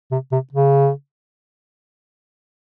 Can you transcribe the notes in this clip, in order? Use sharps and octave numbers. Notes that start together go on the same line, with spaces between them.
C3
C3
C#3